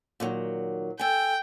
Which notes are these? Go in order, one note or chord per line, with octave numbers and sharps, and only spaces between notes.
A#2 D#3 F#3
A4 G5 G#5